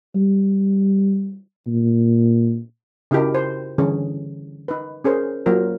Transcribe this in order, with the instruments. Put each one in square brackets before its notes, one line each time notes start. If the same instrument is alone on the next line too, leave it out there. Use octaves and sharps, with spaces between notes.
[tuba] G3
A#2
[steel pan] C#3 D#4 E4 F#4 G4 A#4
C5
D3 E3 G3 C#4 G#4
D#4 B4
C#4 G#4 A#4 C5
F#3 A#3 F4 A#4 C5